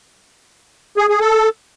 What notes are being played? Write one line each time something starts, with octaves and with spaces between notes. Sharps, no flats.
G#4
G#4
A4